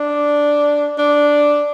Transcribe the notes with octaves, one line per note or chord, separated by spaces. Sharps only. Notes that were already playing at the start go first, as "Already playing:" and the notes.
Already playing: D4
D4